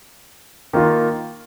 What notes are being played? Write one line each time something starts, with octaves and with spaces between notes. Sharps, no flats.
D#3 A#3 F4